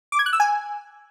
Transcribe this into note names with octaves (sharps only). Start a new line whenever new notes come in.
D6
G#6
F#6
E6
G#5